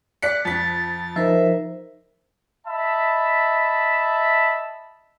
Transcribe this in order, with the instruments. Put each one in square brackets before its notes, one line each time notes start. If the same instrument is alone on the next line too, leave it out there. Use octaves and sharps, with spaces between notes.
[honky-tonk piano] D5 B6 C#7 [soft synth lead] F#6
[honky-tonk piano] F2 B6 [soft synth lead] A6
[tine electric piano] F3 D#4 [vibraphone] A#4 C5 [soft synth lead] E5
[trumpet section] D#5 E5 A5 B5